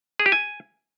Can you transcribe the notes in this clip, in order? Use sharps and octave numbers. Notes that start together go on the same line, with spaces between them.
G#4
G4
G#5